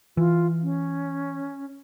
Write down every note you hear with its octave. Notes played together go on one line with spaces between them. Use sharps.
E3 F4
C#4